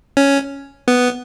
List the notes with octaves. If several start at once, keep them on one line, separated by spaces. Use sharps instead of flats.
C#4
B3